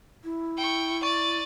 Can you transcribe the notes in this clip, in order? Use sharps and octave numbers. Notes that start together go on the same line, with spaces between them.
E4
G5 C#6
D5 C#6 A6